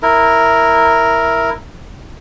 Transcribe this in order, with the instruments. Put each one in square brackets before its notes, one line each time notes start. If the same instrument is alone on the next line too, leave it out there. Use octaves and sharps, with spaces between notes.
[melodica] E4 A#4